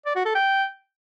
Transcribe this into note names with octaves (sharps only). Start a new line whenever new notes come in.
D5
F#4
A4
G5